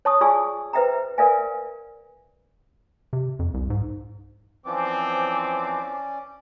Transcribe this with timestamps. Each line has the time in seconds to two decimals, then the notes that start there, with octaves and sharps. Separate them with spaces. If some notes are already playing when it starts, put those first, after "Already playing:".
0.05 C#5 A5 C#6 D#6
0.21 F4 G#4 D5 G#5 C#6 E6
0.73 B4 C5 E5 G5 A#5
1.18 A#4 B4 D5 E5 F5 G#5
3.13 C3
3.39 F2
3.54 C2
3.70 G#2
4.66 E3 F3 C4 C#4 D5 D6